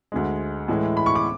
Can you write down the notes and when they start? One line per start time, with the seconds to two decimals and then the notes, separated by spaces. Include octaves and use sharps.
0.12 D2 D3 G#3
0.68 A2 E3 G#3
0.97 B5
1.06 C#6
1.15 D6